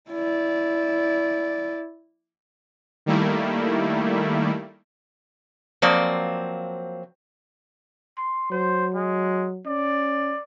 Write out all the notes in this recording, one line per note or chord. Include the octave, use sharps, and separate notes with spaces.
E4 D5
D#3 G3 A3 A#3 E4
F3 F#3 A#3 C4 C5 D5
C6
F#3 C5
G#3
C#4 D5